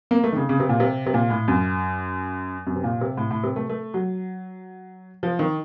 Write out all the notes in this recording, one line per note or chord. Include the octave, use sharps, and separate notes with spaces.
A#3
A3
D#3
C#3
C#3
C3
A#2
C3
C3
A#2
A2
F#2
F#2
C3
A#2
C3
A2
A2
C3
A3
A3
F#3
F3
D#3